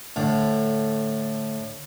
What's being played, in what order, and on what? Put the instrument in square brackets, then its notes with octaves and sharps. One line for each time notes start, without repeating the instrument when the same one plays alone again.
[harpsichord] A2 D3